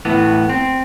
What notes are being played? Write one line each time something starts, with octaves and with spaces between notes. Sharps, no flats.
A2 E3 B3
C4